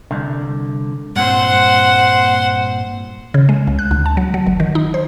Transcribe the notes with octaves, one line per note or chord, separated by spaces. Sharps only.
C2 D3
G2 A#2 C4 C5 F#5
C#3
G#3
C#2
F#6
D2
A5
F#3
F#3
G1
D#3
D#4
C5